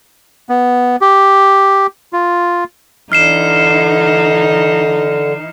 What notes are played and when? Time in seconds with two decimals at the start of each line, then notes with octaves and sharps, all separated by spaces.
0.49 B3
1.01 G4
2.13 F4
3.12 D3 E3 D#4 F6 C7 E7